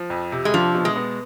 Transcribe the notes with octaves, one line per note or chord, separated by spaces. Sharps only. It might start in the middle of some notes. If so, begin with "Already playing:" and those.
Already playing: F3
F2
C3
G#3
F3 D4
B2
G#3
B3